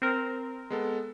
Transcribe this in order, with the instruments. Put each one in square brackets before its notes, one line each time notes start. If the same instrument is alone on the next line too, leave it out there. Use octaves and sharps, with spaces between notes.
[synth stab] C4 A#4
[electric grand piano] G#3 B3 A4